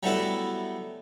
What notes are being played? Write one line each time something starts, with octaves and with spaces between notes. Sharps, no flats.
F#3 G3 A3 B3 E4